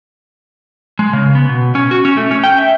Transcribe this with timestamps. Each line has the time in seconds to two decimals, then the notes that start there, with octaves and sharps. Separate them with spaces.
0.99 G#3
1.13 C#3
1.35 B3
1.49 B2
1.75 C#4
1.91 F#4
2.05 C#4
2.17 A3
2.31 C#4
2.44 G5
2.58 E5